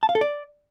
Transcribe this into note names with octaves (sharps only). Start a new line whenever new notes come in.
A5
F5
A4
D5